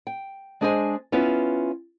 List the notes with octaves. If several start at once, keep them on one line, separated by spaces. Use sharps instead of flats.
G5
G#3 D4 G#4 C5 D#5 G#5
B3 C#4 E4 F4 B4